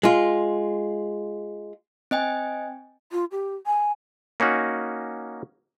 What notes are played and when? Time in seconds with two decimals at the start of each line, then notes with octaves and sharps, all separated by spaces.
0.03 G#3 F4
2.11 C4 D#5 G5 G#5
3.12 F4
3.31 G4
3.66 G#5
4.40 A#3 C#4 D#4 F#4